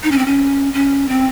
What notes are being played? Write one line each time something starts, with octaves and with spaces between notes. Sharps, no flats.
D#4
C#4
C4
C#4
C#4
C4